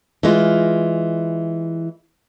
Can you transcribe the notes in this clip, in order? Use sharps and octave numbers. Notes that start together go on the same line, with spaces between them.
E3 G#3 F4